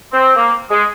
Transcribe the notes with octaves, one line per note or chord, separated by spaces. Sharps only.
C4
A#3
G#3